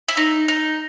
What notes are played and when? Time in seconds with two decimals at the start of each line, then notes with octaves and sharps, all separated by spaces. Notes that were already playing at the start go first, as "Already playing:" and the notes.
0.09 E4
0.17 D#4
0.48 D#4